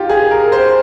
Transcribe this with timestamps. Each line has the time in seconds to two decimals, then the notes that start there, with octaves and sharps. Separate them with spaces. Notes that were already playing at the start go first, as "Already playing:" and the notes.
Already playing: D#4 F4 G4
0.09 G#4
0.31 A#4
0.52 C5